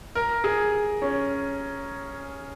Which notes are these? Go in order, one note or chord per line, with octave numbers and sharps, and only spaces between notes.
A#4
G#4
C#4